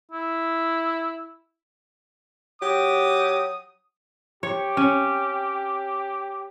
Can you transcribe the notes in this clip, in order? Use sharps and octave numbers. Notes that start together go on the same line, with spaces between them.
E4
F#3 G4 D#6
G4 C#5
C#4